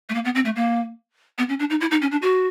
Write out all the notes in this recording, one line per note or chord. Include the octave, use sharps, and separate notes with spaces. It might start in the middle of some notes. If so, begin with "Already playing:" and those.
A3
A#3
B3
C4
A3
A#3
B3
C#4
D4
D#4
E4
D#4
C#4
D4
F#4